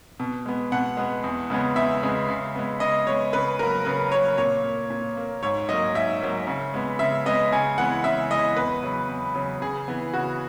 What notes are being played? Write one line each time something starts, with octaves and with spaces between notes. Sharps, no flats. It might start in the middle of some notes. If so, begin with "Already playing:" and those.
B2
G#3 B3
B2 F#5
G#3 B3
E2
C#3 G#3 B3
E2 E5
C#3 G#3 B3
C#3
G#3 B3
C#3 D#5
G#3 B3 C#5
C#3 B4
F#3 A#3 A#4
C#3 B4
F#3 A#3 C#5
A#2 C#5
A#3
A#2
A#3
G#2 C#5
F#3 A#3 D#5
G#2 E5
F#3 A#3
C#3
G#3 B3
C#3 E5
G#3 B3 D#5
C#3 G#5
E3 G#3 B3 F#5
C#3 E5
E3 G#3 B3 D#5
E2 B4
C#3 F#3
E2
C#3 F#3
C#3 G#4
E3 B3
C#3 F#4